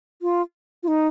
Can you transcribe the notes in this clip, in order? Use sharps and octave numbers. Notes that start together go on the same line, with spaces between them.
F4
F4
D#4